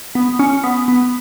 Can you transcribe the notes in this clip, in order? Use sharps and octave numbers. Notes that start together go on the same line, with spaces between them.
B3
C#4
B3
B3